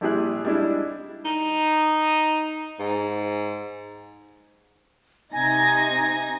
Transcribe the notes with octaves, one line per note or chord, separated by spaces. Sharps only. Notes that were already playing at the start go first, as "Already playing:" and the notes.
A#1 G3 E4 G4 G#4 F#6
G3 G#3 D4 E4
D#4
G#2
C3 D#4 G#5 A#6